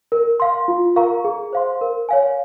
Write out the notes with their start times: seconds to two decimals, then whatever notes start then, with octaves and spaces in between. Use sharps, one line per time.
0.12 A#4
0.40 F5 C6
0.68 F4
0.96 A#4 F5 A#5 C#6
1.25 G#4
1.53 C5 F5 C6
1.81 A#4
2.09 C#5 F5 G#5